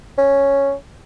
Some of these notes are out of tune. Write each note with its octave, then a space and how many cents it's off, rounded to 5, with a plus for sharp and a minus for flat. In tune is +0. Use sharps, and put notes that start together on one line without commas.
C#4 +0